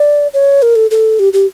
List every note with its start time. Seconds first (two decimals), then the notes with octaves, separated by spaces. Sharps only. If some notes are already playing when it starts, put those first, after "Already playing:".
Already playing: D5
0.34 C#5
0.62 A#4
0.76 A4
0.91 A4
1.19 G4
1.33 G4